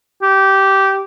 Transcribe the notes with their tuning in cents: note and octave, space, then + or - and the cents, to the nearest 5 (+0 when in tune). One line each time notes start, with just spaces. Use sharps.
G4 -15